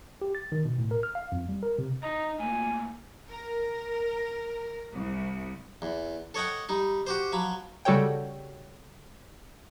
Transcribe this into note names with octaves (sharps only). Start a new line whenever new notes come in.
G4
A6
D#3
B2
A2
A#4
F6
F5
F2
G3
A#4
C3
D#4 D#5 A#5
A2 A#3 G#5
A#4
C2
E2
A4 C#5 D#5 F#5 G5
G3 D#4
F#4 G4 C5
F3 F#3 B5
C#3 G3 F#4 A4 C#5 G5